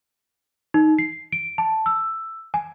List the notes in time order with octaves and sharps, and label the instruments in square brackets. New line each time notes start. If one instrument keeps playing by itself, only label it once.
[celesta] D#4
C7
D7
A5
E6
G#5